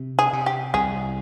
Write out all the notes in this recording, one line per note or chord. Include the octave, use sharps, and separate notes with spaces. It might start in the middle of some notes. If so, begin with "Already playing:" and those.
Already playing: C3
G#4
C3
G4
C2 G#4